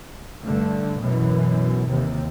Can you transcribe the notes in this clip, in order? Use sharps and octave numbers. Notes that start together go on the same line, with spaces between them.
G2 D3 A3
F#2 B2 E3
D#2 C3